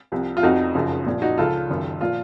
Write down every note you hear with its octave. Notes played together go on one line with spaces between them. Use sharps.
C2 C3 F3
F4
F1 F2 C3 F3 D#4 F#4
F#1 F#2 C#3 F3
C2 A#2 F3
D#4 F#4
C#2 C#3 F3 F4 A4
F#1 F#2 D#3
A#2 F3 F4